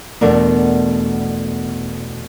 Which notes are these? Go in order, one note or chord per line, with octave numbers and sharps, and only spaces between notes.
E2 B2 A3 D4 A#4 D5